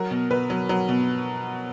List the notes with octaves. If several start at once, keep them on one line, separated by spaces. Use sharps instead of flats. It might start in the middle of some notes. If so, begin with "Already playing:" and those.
Already playing: F#3 A#4
B2
B2 B4
F#3
F#3
B2